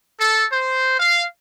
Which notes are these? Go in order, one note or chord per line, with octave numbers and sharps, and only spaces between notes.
A4
C5
F5